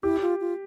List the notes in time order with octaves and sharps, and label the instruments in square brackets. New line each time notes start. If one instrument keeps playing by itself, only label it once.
[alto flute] E4 [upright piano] G4
[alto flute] F4
F4